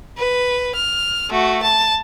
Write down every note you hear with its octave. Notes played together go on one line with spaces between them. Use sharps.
B4
F6
A3 F#4
A5